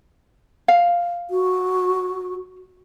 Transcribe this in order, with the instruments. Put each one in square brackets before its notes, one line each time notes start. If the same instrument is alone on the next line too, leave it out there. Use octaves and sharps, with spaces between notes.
[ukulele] F5
[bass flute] F#4